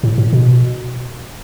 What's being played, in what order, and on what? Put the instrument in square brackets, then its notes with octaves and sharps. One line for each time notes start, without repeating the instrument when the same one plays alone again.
[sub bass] A2
A2
B2